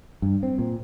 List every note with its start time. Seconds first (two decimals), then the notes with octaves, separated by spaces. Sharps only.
0.22 G2
0.43 C4
0.58 A#2